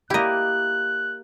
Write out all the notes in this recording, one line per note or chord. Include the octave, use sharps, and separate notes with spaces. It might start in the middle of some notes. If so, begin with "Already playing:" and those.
A#3 E4 G4 D#5 F#6